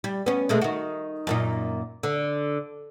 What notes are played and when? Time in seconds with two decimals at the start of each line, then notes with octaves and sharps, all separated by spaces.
0.04 G3
0.26 B3 C#4
0.49 B2 G#3 A3
0.61 D#3 F#4
1.27 F#2 A#2 D#4
2.03 D3